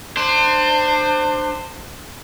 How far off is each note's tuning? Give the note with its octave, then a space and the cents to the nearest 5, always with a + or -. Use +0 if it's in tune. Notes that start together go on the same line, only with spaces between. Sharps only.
D4 +30 C5 +0